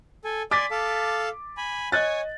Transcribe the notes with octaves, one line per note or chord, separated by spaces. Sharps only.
A4 G#5
D5 G#5 C6 D6 A6 B6
A4 F5 A5
G#5 B5
C#5 D#5 G#5 F#6 A6